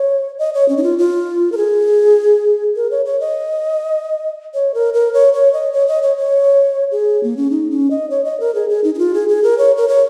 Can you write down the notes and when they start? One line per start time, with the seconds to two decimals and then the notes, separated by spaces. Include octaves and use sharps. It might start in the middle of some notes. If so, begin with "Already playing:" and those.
Already playing: C#5
0.39 D#5
0.54 C#5
0.69 C#4
0.77 D#4
0.83 F4
0.98 F4
1.52 A#4
1.57 G#4
2.76 A#4
2.91 C#5
3.05 C#5
3.21 D#5
4.54 C#5
4.74 A#4
4.94 A#4
5.14 C#5
5.33 C#5
5.53 D#5
5.73 C#5
5.88 D#5
6.03 C#5
6.17 C#5
6.92 G#4
7.23 A#3
7.37 C#4
7.51 D#4
7.71 C#4
7.91 D#5
8.10 C#5
8.25 D#5
8.40 A#4
8.55 G#4
8.69 G#4
8.84 D#4
8.95 D#4
8.99 F4
9.14 G#4
9.29 G#4
9.44 A#4
9.58 C#5
9.77 A#4
9.88 C#5